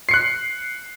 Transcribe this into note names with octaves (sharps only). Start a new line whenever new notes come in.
F#6 C7 C#7